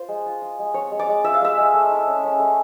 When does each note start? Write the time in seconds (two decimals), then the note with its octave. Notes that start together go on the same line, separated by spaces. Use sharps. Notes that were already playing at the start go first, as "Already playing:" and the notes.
Already playing: F4 C5
0.08 G#3
0.26 F4
0.42 F4
0.59 G#3
0.74 C4 C#5
0.91 G#3
0.99 D5
1.08 G#3
1.24 F4 E5
1.34 F5
1.41 G#3 E5
1.58 G#3
1.74 A3
1.91 E4
2.07 C#4
2.24 C#4
2.39 A3